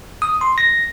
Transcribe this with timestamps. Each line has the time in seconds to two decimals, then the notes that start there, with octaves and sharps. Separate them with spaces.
0.22 D#6
0.41 C6
0.58 A#6